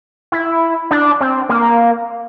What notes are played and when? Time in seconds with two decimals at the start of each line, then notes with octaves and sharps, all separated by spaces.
0.32 E4
0.91 D4
1.21 C4
1.49 A#3